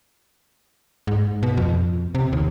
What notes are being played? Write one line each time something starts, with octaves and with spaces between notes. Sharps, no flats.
G#2
B2
F2
C3
D#2